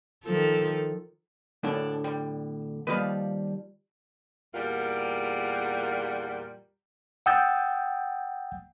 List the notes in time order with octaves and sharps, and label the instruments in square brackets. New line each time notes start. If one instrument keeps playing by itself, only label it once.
[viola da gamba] D#3 F3 A4
[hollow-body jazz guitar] D2 A2 D3 [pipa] A#3 D4
[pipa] G3
[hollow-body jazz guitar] D#2 F3 G3 [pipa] B4 D#5 F5
[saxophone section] E2 A#2 G3 F4 A#4 F#5
[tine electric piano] F#5 G5 D#6 E6 G6 A6